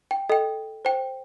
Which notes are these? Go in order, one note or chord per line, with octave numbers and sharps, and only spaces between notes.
G5
A4 D#5 G5
C5 G5